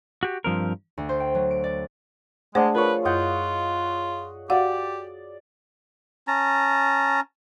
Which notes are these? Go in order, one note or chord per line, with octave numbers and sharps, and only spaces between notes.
F#4 G4
G2 F3 C4 A#4
D2
C5
G5
F#3
D7
D5
G#3 A3 D4 G#4 C5 F#5
F3 A#4 B4 C#5
F#2 F4 D#5 F#5 G6
F#4 G4 D5 F5 F#5
C#4 A5 A#5